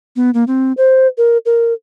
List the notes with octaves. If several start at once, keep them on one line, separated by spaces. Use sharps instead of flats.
B3
A#3
C4
C5
A#4
A#4